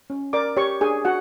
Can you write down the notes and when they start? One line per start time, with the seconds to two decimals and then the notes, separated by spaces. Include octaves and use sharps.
0.10 C#4
0.33 A#4 D5 D6
0.57 G4 C#5 C#6
0.81 D4 G#4 G#5
1.05 F#4 F#5